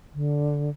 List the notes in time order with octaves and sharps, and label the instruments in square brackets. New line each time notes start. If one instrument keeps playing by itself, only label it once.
[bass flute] D3